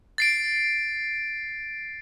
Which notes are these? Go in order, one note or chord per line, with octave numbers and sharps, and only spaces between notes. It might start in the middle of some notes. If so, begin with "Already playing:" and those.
A6 C7 D7